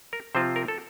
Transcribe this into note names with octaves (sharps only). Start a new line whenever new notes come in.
A#4
C3 F3 C4 F4 C5
A#4
A4